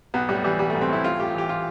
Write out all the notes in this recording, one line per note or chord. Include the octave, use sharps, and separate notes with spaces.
B1 B3
A2 G3
E3 G3
B1 G3
B1 A3
C4
A2 E4
A1 F4
A2 G4
E3 G4
F4